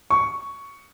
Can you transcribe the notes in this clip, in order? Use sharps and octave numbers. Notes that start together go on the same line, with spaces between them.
C#6